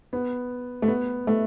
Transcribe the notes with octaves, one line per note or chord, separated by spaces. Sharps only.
B3
A3
B3
A3